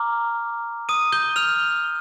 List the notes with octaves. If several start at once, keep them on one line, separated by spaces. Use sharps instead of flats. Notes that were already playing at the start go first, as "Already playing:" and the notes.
Already playing: A#5 D6 F6
D#6 D#7
G6 G7
F6 F7